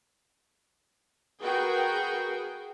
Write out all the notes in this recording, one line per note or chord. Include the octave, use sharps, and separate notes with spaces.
F#4 G#4 A#4 B4 G5